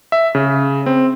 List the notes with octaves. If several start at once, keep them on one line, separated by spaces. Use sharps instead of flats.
E5
C#3
C4